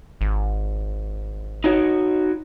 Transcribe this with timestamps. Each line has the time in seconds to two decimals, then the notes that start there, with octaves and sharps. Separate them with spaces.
0.21 G#1
1.64 D#4 F#4 C#5